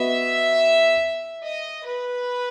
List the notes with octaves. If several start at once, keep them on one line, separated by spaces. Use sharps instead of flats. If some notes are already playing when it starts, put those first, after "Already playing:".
Already playing: B3 F#4 B4 D#5 E5
D#5
B4